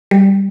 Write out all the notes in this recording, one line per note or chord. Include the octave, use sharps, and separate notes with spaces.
G3